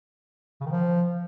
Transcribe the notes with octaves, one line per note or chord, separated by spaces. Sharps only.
C#3
D#3
F3